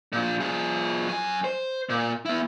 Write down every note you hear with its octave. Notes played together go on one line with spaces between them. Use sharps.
A#2 F3
F3 G#4
F#2 G#5
C5
A#2
B3 E4